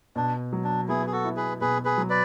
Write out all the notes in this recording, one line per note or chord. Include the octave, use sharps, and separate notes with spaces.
B2 D4
F#3
D4
B3 E4 G#4
G#4
F#4 A4
E4
G#4 B4
B2 G#4 B4
G#4 B4
F#3
B4 D5